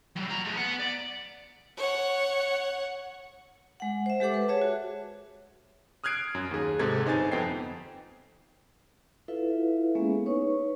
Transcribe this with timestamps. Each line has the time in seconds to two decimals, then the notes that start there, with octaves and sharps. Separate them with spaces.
0.16 F#3 G3
0.29 F4 A#5
0.45 A3 G#4
0.56 B3 F#5
0.80 D5
1.77 C#5 F#5
3.80 G#3 F#5
4.06 C5 E5
4.20 G#3 G4 A4 F#5 D6
4.34 B4
4.48 G#4 C#5 E5 A5
4.62 F#4
6.04 D#6 F6 F#6 G#6 C7 D7
6.35 F#2
6.51 D#2 G#4
6.79 G#2 C3 D#4 A4 G#6
7.05 G1 D#4 C5 G#5 A6
7.32 F2 B3 G5 C7
9.28 E4 F4 A4 B4 E5 F5
9.95 G#3 A#3 B3 C#4 G#4
10.26 D#4 B4 C#5 C#6